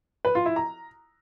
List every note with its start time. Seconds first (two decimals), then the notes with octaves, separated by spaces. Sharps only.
0.25 B4
0.35 F4
0.46 E4
0.56 A#5